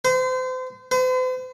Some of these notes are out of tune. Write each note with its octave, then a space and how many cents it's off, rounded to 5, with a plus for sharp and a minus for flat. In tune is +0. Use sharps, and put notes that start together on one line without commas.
C5 -35
C5 -45